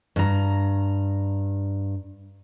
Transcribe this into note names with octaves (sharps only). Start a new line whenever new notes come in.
G2 A#5